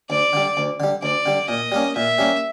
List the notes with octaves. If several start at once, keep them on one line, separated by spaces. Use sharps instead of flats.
D2 D5
D3 G3
D2
D3 G3
D2 D5
D3 G3
A#2 D#5
G3 A#3 C#4
A#2 E5
G3 A#3 C#4